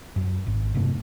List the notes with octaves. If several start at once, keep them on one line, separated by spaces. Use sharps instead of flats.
F#2
G#1
F1 G2 C3 A3